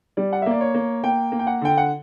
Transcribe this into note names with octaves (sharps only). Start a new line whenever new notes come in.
G3 D5
F#5
E5
A#3 D5
C#5
A#3
A#3 G5
A#3
G5
F#5
D3 G5
F#5